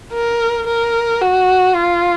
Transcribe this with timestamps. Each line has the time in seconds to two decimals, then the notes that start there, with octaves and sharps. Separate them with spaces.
0.13 A#4
0.67 A#4
1.21 F#4
1.75 F4